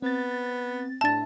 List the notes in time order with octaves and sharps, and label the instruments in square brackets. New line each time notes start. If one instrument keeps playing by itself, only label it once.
[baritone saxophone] B3 [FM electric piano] C4 A6
[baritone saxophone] A2 [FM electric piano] D4 E5 [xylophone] A5 A6